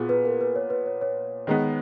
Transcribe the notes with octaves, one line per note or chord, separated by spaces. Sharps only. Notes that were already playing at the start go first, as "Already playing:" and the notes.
Already playing: A#2 B3 F4 F#4 G#4
B4
A#4
B4
C#5
B4
C#5
C#5
D#3 G#3 B3